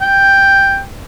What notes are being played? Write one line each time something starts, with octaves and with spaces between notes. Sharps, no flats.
G5